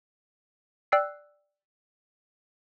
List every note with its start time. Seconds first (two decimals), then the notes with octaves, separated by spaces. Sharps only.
0.92 D5 G5 E6 F#6 C7